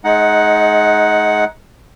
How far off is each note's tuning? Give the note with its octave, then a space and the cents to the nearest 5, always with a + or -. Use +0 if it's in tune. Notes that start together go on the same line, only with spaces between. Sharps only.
G#3 +30 D#4 +10 F#5 +0